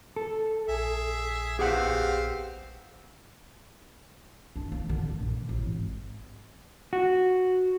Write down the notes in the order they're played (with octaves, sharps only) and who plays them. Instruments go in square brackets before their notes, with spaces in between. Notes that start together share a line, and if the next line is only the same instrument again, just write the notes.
[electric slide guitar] A4
[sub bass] A#1 [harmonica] G#4 E5
[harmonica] B3 C4 F5 [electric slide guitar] G4 G#4 F#5
[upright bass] D4
A#3
D3
G#1
A#1
C#3
A1
G#1
[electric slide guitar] F#4